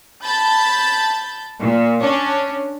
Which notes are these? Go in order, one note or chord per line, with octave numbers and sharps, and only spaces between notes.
A5 B5 G6 A6
A#2
C#4 D4 C#5